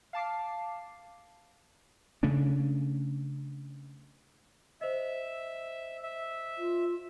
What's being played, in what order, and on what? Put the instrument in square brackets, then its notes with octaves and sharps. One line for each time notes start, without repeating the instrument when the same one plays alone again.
[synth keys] F5 A5 D6 C7
[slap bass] C#3 A3 C#4 D4
[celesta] C5 D#5 [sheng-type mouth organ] E5
[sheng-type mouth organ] E5
[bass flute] F4